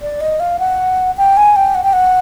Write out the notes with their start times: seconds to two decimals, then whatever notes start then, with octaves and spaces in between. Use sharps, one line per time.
0.02 D5
0.21 D#5
0.40 F5
0.59 F#5
1.18 G5
1.37 G#5
1.56 G5
1.75 F#5
1.84 G5
1.93 F#5